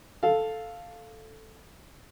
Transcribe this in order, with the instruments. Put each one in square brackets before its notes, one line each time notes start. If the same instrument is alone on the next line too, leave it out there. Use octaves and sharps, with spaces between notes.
[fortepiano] A4 F5